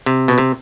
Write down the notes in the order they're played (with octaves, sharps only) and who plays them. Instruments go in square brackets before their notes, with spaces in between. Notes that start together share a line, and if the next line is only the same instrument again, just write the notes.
[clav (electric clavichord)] C3
B2
C3